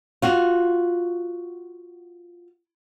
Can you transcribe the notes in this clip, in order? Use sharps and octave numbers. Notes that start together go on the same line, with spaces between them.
F4 F#4